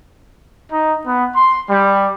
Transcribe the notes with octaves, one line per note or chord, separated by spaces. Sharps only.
D#4
B3
C6
G3